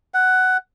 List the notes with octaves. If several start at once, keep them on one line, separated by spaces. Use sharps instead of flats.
F#5